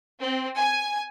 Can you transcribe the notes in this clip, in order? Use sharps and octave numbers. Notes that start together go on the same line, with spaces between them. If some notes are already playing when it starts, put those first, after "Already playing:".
C4
G#5